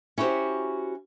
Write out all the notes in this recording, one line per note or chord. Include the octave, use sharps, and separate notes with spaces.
C#4 E4 F#4 G4 C5